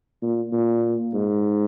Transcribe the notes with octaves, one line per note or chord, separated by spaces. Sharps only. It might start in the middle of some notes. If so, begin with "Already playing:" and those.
A#2
A#2
G#2